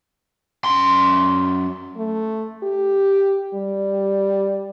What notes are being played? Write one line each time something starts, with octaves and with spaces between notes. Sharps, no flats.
F#2 C6
A3
G4
G3